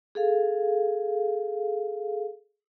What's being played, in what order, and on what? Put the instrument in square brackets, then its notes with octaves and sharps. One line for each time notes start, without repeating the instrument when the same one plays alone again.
[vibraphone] G#4 A4 F5